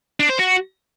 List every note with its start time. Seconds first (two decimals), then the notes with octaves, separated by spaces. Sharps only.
0.20 D4
0.29 C5
0.39 F#4